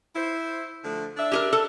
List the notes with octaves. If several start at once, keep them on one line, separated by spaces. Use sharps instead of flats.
E4 C5
D3 F3 A3
D4 E5
G4 G#4 A#4
A4